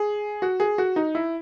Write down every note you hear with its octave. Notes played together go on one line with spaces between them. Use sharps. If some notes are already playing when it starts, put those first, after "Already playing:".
Already playing: G#4
F#4
G#4
F#4
D#4
E4